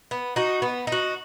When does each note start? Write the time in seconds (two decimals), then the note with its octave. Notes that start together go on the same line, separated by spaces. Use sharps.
0.11 B3
0.36 D#4 F#4
0.62 B3
0.87 D#4 F#4